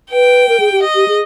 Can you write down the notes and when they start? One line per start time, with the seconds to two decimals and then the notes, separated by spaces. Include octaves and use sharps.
0.12 B4 G5
0.49 A#4
0.60 G#4
0.72 G4
0.84 D#5
0.95 G4
1.08 G#4